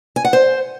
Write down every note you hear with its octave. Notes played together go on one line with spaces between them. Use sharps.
G#5
F#5
C5